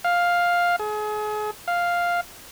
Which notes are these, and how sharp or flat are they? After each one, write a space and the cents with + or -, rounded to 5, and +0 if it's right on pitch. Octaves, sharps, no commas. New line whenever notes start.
F5 +5
G#4 +35
F5 +0